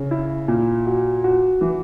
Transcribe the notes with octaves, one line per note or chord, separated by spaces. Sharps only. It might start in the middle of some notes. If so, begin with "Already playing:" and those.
Already playing: C#3
E4
A#2
F#4
F#4
E3